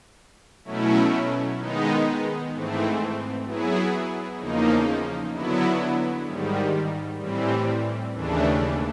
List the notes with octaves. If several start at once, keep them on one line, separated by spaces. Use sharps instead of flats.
B2 F#3 A3 C#4 E4
D#3 G#3 B3 D#4
G#2 E3 A3 C4
F#3 B3 E4 G#4
E2 C#3 F3 A#3 D#4
D3 F#3 B3 E4
G#2 D#3 G3
A2 E3 G3 C4
D#2 C#3 E3 A3 D4